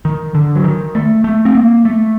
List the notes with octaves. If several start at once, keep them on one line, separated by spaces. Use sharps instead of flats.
D#3
D3
F#3
D#3
A3
A3
C4
A#3
A3